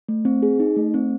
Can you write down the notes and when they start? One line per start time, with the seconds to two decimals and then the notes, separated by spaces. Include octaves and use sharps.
0.09 A3
0.25 C4
0.42 G#4
0.60 D#4
0.76 A3
0.94 C4